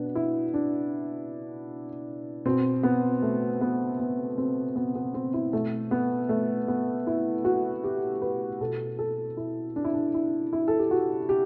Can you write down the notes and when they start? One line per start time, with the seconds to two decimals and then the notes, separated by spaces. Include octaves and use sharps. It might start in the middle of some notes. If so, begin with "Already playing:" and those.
Already playing: B2 B3 D4
0.15 E4
0.54 D4
2.45 B2 C4
2.83 B3
3.23 A3
3.61 B3
4.00 B3
4.38 C4
4.76 B3
4.95 B3
5.14 C4
5.34 E4
5.53 B2 A3
5.91 B3
6.29 A3
6.68 B3
7.07 E4
7.45 F#4
7.84 G4
8.22 B4
8.61 B2 A4
8.99 A4
9.37 E4
9.76 D4
9.84 E4
9.94 D4
10.14 E4
10.53 E4
10.68 A4
10.79 G4
10.91 F#4
11.29 G4